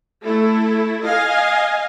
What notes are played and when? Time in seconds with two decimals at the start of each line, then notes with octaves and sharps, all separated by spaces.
0.23 A3 E4 A4
1.03 D#5 F5 G#5